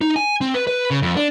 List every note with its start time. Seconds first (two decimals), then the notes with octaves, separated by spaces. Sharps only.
0.01 D#4
0.16 G#5
0.41 C4
0.54 B4
0.67 B4
0.91 C#3
1.02 F2
1.17 D4